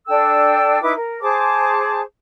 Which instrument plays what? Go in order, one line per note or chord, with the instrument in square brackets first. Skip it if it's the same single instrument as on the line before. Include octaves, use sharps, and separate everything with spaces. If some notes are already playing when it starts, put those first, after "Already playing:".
[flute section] D4 A4 G5 E6
D#4 E4 B4 D6
A#4
G#4 C5 A5 D6